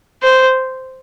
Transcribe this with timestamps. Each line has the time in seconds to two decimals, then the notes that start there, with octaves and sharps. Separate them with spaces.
0.23 C5